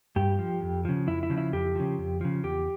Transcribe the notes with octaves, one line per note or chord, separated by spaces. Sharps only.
G2 G4
F3
F2
C#3 F3
F2 E4
E4
C#3 F3
E4
F2 G4
C#3 F3
F2
C#3 F3
E2 G4